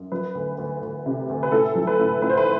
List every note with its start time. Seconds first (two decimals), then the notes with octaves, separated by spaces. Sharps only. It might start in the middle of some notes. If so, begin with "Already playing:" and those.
Already playing: F#2
0.12 F#3 B4
0.35 D2
0.58 D2
0.82 D2
1.06 C3
1.29 D2
1.43 B4
1.52 A2 A4
1.75 F#3
1.87 B4
1.99 A2
2.22 A2 B4
2.29 C5
2.37 B4